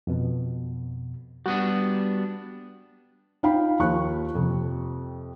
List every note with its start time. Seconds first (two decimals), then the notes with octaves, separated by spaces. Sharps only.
0.07 F2 B2
1.46 G3 B3 D4 F#4
3.43 D#4 F4 F5 G5 B5
3.79 D#2 F3 C#6 F#6
4.35 F2 C3